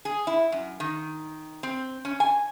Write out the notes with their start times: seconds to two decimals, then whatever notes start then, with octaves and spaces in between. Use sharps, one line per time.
0.05 G#4
0.27 E4
0.52 F#2
0.80 D#3
1.63 C4
2.05 C#4
2.20 G#5